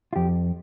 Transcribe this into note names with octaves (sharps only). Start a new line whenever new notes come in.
F4
F2 G4